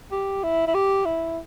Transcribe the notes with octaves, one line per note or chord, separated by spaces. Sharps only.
G4
E4
E4
G4
E4